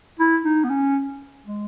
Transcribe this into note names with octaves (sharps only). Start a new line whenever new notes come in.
E4
D#4
B3
C#4
G#3